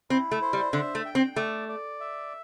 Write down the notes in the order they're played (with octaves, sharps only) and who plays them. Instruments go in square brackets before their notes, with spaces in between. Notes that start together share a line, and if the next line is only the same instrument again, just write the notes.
[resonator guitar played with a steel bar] C4 [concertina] E4
[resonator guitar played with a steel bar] A3
[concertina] C5
[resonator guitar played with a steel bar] G3
[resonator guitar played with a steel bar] D3 [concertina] E5
[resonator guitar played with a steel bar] A3
[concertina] G5
[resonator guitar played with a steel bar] C4
[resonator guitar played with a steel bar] A3 [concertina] D5
[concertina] D5
E5